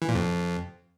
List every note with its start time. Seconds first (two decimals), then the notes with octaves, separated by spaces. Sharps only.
0.02 E3
0.09 A#2
0.15 F2